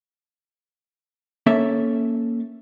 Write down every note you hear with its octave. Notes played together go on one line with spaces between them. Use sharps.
A#3 C#4 A4 E5